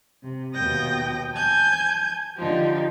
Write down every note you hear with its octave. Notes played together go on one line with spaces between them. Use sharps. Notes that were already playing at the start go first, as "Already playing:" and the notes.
C3
D#2 B2 G5 D#6 G6 A#6
G#5 A5 G6 G#6
D3 F3 D#4 G4